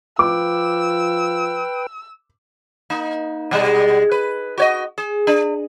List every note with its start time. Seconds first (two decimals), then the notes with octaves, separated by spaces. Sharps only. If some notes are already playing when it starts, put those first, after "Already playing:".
0.19 F3 B4 G5 D6 E6
2.90 A#3 D#4
3.51 B2 G3 G#3
4.11 B4
4.58 F#4 C#5 D#5
4.98 G#4
5.27 D4